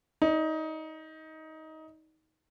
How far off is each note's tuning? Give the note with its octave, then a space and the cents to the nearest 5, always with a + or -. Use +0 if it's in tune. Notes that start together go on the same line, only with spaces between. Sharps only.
D#4 +20 D5 +0